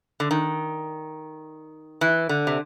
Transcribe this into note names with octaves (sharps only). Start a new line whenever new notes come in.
D3
D#3
E3
D3
C3